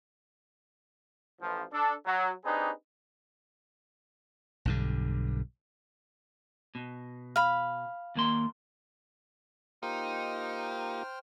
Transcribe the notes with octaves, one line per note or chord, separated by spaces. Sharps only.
A1 F3
D4 A4
F#3
C4 D4 D#4 G4 G#4 B4
B1 G2 D3
B2
F5 B5
D#2 A#3 C6
A#3 D#4 F4 G4 C5 G5 F6